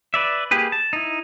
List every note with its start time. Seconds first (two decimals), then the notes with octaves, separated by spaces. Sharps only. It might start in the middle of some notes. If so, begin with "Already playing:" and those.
0.14 B4 D5 E5
0.51 A#3 G4 G#4 B4
0.72 A5
0.93 D#4 E4